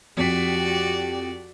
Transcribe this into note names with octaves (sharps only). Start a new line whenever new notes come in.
F2 F#4 G4 D5 B6